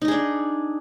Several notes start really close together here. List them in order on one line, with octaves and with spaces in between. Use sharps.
D#4 D#5 G#4 D4